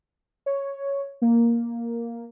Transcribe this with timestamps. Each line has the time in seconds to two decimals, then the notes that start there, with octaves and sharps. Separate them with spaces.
0.46 C#5
1.22 A#3